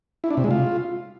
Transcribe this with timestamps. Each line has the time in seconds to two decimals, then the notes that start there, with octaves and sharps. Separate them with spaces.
0.24 E4
0.30 D4
0.37 C3
0.44 G#3
0.51 F4